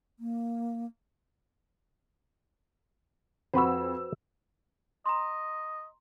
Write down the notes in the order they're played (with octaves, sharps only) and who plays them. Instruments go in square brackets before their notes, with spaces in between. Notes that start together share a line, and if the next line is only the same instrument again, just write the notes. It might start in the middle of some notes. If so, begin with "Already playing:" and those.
[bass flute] A#3
[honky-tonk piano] F2 E6 [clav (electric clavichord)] F#4 B4 C5
[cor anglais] D#5 [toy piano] A#5 C6